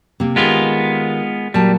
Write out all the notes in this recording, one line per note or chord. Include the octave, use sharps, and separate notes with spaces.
C3 A#3
D#3 G#3 B3 F4 G4
A#2 F#3 G3 A5